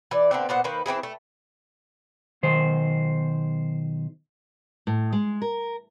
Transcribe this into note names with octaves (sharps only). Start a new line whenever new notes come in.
E3 D5
D3 B3 C4
A#2 B3 C5 F#5
D#3 A#3 B4 C5
E3 C4 E4 G#4
A3
B1 D#3 C5
A2
G#3
A#4